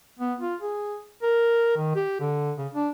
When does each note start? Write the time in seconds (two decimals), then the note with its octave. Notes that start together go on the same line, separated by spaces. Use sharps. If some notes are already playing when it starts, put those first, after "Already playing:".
0.19 B3
0.41 F4
0.61 G#4
1.23 A#4
1.77 D#3
1.95 G4
2.20 D3
2.58 C#3
2.74 D4